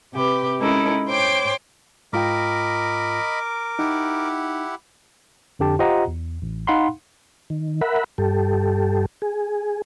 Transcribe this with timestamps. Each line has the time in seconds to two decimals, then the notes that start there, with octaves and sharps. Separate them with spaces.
0.13 C3 G4 B4
0.58 G#3 C#4 D#4 E4 A4 A#4
1.07 C5 C#5 G5 D6
2.13 G#2 F4 A#4 D#5 G5 B5 D6
3.79 D#4 E4 G4 F#5
5.59 F2 D3 G4 A5
5.79 F4 G4 C5 D#5 F#5 A#5
6.07 E2
6.42 A1
6.67 D#4 F5 F#5 B5 C6
7.50 D#3
7.81 A#4 E5 F#5 B5
8.18 G2 G4 A4
9.22 G#4